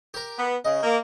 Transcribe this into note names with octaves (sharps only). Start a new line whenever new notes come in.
G4 A#4
B3
C#3 D#5
A#3